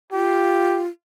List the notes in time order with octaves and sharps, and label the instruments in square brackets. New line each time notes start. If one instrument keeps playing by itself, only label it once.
[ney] F4 [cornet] G4